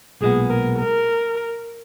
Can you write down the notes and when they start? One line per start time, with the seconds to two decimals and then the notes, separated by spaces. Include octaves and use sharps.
0.21 B1 A#2 G#3 B3 G#4
0.50 A#4
0.79 A#4